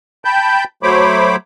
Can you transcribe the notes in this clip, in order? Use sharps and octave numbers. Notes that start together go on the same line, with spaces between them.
G5 A5 B5 G6
F#3 A3 C5 C#5 B5 D6